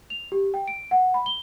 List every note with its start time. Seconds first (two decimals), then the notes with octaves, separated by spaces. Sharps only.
0.10 F7
0.32 G4
0.54 G5
0.68 D7
0.91 F#5
1.14 B5
1.26 G7